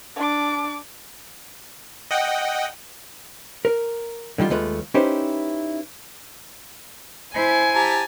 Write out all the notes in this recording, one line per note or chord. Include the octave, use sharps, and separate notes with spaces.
D4 D6
D#5 F#5 G5
A#4
D3 D#3 G3 F4
D#2 G#3 A3 F4 B4
C#4 D#4 E4 G4 B4 C5
E4 C5 G#5
G4 A5 A#5